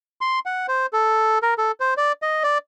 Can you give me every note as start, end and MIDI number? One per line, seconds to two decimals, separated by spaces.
0.21 0.39 84
0.46 0.66 78
0.68 0.86 72
0.93 1.39 69
1.43 1.54 70
1.58 1.72 69
1.80 1.94 72
1.97 2.12 74
2.22 2.43 75
2.44 2.58 74